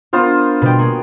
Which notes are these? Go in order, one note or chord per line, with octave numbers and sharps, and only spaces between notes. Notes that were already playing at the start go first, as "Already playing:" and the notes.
B3 D4 F4 A#4 C5
B2 G3 B4 G5
A#3 F#4 G#4